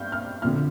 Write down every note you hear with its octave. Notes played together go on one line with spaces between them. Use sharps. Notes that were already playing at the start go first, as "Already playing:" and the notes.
Already playing: G2 F6 G6
F6
F2 D3 F3 F6